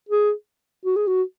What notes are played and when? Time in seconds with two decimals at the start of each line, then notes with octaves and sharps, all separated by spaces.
0.09 G#4
0.85 F#4
0.96 G#4
1.07 F#4